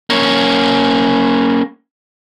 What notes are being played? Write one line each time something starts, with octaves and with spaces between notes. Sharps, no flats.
A#3 C#4